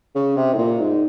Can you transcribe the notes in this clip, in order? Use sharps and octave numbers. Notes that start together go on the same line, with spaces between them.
C#3
C3
A2
A#2
G#2